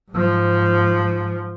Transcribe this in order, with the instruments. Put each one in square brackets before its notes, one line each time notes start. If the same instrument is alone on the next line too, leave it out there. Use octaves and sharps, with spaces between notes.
[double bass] G#2 F3